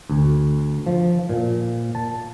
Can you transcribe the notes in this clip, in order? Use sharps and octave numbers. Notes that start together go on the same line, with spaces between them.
D2
F3
A#2
A5